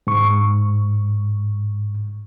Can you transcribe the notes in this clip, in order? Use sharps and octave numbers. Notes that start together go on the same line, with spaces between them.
G#2 C#6